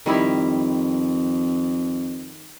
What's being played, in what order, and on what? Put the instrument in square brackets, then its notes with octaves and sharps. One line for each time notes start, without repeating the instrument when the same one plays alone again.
[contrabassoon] F2 [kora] D#3 G3 E4